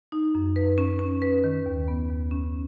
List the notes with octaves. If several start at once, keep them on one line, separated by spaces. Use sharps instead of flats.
D#4
F#2
B4
C#4
C#4
B4
D#3
D#2
B3
D#2
C#4